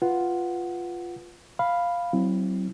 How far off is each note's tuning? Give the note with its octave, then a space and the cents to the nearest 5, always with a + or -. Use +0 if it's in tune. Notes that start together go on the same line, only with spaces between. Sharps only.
F4 +0 B4 +0 F#5 +0
F5 +0 B5 +0
F#3 +30 C4 +0 E4 +0